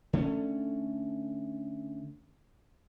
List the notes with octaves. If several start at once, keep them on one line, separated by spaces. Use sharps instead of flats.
D3 A3 B3 C#4